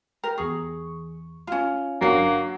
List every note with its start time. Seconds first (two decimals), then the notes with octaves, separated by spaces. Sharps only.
0.24 A#4 G5
0.38 E2 G#4 C#6
1.47 C#4 F4
2.01 G1 F#3 A#3 D4 C#6 C7